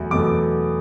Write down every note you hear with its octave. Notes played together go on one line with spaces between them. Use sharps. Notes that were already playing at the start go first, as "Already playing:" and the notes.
Already playing: E2 B2 F#3 A3
E2 B2 F#3 A3 D6